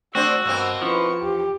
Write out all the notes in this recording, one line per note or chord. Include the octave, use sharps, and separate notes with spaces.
A3 C4 D4 F#4 C5 E6
G2 B2 A#3 C4
F3 C#4 E4 B4 C#6
E2 G4